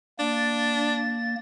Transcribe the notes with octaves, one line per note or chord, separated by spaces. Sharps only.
A#3 D4 A6